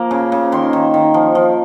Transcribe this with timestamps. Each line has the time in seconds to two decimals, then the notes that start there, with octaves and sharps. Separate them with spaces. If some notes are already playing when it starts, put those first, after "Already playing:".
Already playing: F3 A#3
0.11 C#3
0.32 C#3
0.52 D#3 C6
0.73 D#3
0.94 D#3
1.14 F3
1.35 F3